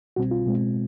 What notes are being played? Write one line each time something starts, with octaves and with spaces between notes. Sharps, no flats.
C2 B2 G3 C4 F#4
F4
B2 G#3 C4